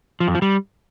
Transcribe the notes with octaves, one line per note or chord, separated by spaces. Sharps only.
F3
F2
F3
G3